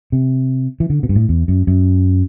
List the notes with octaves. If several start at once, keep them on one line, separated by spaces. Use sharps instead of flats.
C3
E3
D3
B2
G2
A2
E2
F#2
F#2